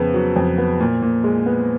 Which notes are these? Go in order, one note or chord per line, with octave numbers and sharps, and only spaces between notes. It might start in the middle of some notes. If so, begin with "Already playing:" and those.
Already playing: F2 C#3 B3
F#3
F2
B3
A#2
A#2
G#3
B3